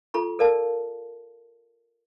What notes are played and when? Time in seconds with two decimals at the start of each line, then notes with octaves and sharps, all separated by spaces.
0.14 F4 A4 A#5 C#6
0.39 A4 A#4 D5 F5 A5